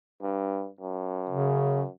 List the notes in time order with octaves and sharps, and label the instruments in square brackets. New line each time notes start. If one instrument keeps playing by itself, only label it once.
[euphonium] G2
F#2
[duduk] C#3